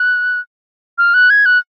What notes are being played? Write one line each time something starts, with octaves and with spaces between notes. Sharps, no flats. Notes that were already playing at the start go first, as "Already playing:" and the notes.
Already playing: F#6
F6
F#6
G#6
F#6